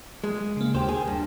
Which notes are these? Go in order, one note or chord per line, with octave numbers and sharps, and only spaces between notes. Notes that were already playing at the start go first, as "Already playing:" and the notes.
G#3
C#3 A#3
D#2 G4 C5
G#4
G2